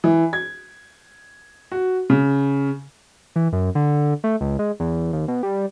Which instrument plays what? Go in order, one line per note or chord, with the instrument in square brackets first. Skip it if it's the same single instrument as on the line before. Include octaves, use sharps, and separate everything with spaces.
[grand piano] E3
G#6
F#4
C#3
[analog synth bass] E3
F#2
D3
A3
C#2
G#3
E2
D#2
B2
G3